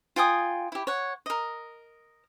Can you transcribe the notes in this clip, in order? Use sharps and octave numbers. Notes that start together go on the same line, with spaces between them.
F4 G5 G#5 D#6
E4 G4
C#5 F#5
A#4 D#5